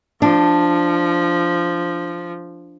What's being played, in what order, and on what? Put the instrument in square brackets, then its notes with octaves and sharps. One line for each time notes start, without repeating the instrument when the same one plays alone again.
[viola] F3 [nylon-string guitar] D4